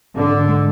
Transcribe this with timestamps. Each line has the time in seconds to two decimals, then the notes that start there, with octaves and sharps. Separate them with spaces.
0.17 G#2 D3
0.33 G#2
0.49 G#3